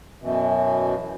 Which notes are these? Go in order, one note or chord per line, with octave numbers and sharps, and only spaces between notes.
F#2 B2 E3